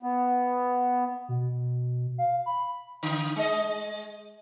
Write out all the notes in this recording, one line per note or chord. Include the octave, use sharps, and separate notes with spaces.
B3
B2
F5
B5
D3
G#3 D#5